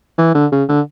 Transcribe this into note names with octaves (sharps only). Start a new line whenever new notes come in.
E3
D3
C#3
D3